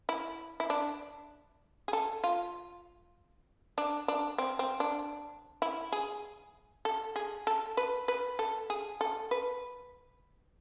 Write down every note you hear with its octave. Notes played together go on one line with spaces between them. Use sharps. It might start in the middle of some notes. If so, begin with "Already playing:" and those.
E4
E4
D4
G#4
A4
F4
D4
D4
C4
C4
D4
E4
G#4
A4
G#4
A4
B4
B4
A4
G#4
A4
B4